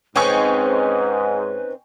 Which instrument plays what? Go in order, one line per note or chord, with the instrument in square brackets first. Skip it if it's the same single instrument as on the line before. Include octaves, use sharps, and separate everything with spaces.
[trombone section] G#2 [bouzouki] C4 C#4 D#4 [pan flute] B4 [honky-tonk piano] G5 G#5 C#6